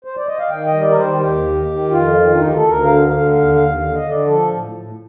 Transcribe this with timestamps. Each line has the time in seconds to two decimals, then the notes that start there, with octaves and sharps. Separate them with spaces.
0.05 C5
0.16 D5
0.27 D#5
0.39 F5
0.50 D#3 G5
0.66 D#5
0.73 G3
0.81 D5
0.90 A#4
0.96 D#3 C5
1.20 D#2 G4
1.43 D#3
1.67 D#3
1.91 F2 F4
2.14 D#3
2.32 D4
2.37 D2 D#4
2.47 G4
2.54 A4
2.61 D2
2.69 A#4
2.84 D3 F5
3.07 D3 F5
3.31 D#2 F5
3.54 D#2 F5
3.77 D3 F5
3.94 D#5
4.02 D3
4.09 D5
4.25 F3 A4
4.48 A2
4.72 A2